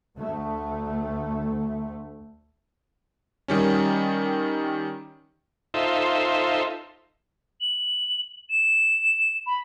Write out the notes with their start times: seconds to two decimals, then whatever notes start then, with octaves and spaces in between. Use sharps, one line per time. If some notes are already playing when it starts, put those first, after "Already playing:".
0.17 D2 A3
3.48 D#3 G3 C#4
5.74 D#4 F4 A4 C5 E5
7.60 F#7
8.49 E7
9.46 B5